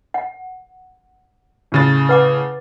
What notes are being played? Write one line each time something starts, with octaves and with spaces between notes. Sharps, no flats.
F#5
A2 C#3 A6
B4 F#5 D6